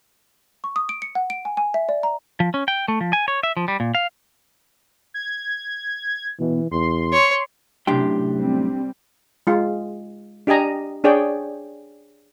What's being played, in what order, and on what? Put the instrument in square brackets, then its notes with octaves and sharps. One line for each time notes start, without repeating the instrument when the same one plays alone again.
[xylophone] C#6
D#6
D7
C#7
F#5
D7
G#5
G#5
E5
D5
A#5
[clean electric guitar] F3
C#4
G5
A3
F3
G#5
C#5
E5
F3
G3
A#2
F5
[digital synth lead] G#6
[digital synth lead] B2 [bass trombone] E3
[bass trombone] E2 [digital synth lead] C6
[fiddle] C#5
[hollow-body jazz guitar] F#2 A2 G5 [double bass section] C3 [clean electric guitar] D4 G4 C6
[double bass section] G3 C4
[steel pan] G#3 F4
D4 G4 D#5 G#5 A#5
D4 G#4 C#5 D5 G5